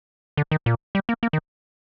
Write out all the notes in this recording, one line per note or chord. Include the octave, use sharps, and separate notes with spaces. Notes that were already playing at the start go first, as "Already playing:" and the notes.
D3
D#3
A#2
G3
A#3
A#3
D#3